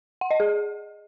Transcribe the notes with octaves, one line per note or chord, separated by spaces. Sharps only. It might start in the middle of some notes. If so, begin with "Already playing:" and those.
F#5
D#5
G#4